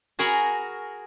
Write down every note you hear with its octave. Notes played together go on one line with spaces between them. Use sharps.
F#4 G#4 A#4 F#5 B5